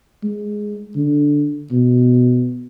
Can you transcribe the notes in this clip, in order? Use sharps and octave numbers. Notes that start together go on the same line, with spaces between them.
G#3
D3
B2